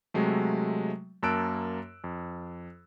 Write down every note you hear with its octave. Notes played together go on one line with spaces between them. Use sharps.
C3 F#3 G#3 A3
F#2 A#3 A5 E6 F#6 D7
F2